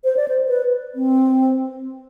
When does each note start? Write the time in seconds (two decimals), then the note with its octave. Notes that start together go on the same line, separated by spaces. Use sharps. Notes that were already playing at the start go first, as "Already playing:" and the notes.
0.04 C5
0.17 D5
0.28 C5
0.48 B4
0.95 C4